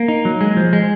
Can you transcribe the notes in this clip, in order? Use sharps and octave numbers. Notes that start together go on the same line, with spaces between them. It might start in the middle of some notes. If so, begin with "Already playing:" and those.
Already playing: A#3
D#4
F#3
G#3
F3
G#3